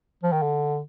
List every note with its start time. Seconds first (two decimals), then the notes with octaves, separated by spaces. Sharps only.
0.23 F3
0.32 D#3
0.42 D3